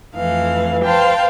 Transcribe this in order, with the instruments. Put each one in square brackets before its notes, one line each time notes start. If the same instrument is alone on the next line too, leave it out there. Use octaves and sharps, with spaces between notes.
[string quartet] F2 E3 A3 F5
B4 C5 F5 G5 A5